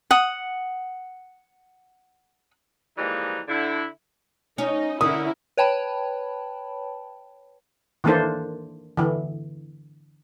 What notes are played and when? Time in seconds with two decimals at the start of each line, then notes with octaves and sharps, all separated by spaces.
0.11 F#5 D#6
2.97 E3 F3 G3 G#3 A#3 D#4
3.48 D3 E4
4.58 C#4 D#4 D#5
5.01 D3 C#4 E4 A#4 D#6
5.57 B4 C#5 G5 A5 B5
8.04 D#3 E3 A#3 D4 A4 C5
8.97 D3 E3